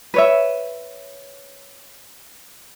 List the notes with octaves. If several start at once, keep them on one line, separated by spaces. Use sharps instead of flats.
B4 C#5 E5